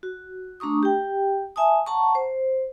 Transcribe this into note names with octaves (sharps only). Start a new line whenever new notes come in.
F#4
A3 D4 A#5 C#6 D#6
G4 G5
E5 G#5 A5 D#6
F#5 A5 A#5 C#6
C5